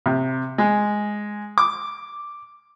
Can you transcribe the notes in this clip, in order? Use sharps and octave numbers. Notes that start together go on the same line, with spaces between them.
C3
G#3
D6